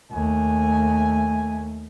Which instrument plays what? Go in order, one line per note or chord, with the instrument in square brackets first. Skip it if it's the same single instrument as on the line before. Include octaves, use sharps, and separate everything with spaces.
[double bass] D#2 A3 [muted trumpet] G#5